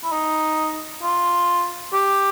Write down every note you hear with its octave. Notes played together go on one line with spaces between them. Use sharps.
E4
D#4
F4
G4